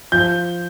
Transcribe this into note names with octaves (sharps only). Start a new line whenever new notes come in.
F3 G6